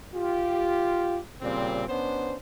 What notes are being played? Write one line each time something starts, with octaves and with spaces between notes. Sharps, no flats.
F4 G4
A#2 C#3 G3 C4
B3 C#4 D4 C5